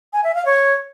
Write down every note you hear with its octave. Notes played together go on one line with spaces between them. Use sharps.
G#5
E5
F5
C#5